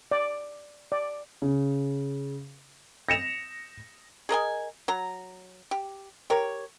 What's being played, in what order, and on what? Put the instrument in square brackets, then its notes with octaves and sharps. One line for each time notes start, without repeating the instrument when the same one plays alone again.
[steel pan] D5
D5
[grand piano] C#3
[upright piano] A#6 C#7 E7 F7
[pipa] G#4 A#4 D#5 G#5
F#3 A#5
G4
G4 A#4 C#5